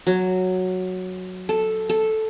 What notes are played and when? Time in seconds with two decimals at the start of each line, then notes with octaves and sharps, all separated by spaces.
0.07 F#3
1.49 A4
1.89 A4